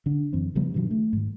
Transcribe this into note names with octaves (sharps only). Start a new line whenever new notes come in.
D3 D4
F#2 E3 C4
C#3 F3 G3 B3
G2 B2 D#3 F#3
A3
G#2 D#3